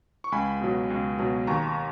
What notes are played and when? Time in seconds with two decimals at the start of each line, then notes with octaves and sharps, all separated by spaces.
0.24 C#6
0.32 C#2 G#5 B5
0.61 B2 F#3
0.90 C#2
1.19 B2 F#3
1.47 D#2 A#5 C#6